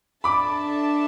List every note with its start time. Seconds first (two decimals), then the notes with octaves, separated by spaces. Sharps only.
0.24 D4 A4 E5 A5 B5 D6